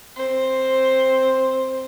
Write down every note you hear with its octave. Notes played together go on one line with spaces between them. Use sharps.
C4 C5